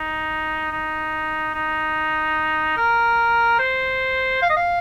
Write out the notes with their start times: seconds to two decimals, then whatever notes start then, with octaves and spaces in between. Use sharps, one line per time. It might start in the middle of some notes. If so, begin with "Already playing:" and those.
Already playing: D#4
0.72 D#4
1.54 D#4
2.77 A#4
3.59 C5
4.42 F5
4.50 D#5
4.57 F5